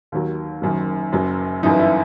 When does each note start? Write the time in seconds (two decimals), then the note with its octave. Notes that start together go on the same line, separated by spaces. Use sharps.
0.12 D#2 D#3 F#3
0.62 F#1 F#2 D#3
1.12 F#1 F#2 F#3
1.63 G1 F#2 E3 D#4
1.79 E4